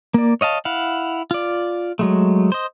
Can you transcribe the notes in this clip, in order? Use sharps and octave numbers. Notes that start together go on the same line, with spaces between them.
A#3 D5
C#5 D#5 F5 A5
E4 F5 F#5
F4 D5
F#3 G#3 A3
C5 D#5